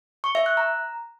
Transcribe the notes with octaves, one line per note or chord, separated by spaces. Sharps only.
C#6
E5
F#6
A#5